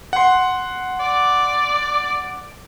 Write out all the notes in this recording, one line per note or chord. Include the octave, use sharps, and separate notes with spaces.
F#5 C6
D5